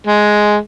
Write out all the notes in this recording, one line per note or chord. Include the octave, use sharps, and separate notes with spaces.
G#3